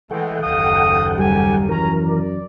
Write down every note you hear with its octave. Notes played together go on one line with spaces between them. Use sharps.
E3 G#3 A3 A4 F#5 G5
F#1 D#2 D#5 F5 D#6
G3 G4 G#5
F#2 E3 C#4 A#4 A#5
D5